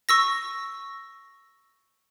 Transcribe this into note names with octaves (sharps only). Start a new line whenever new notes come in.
C#6 E6 A#6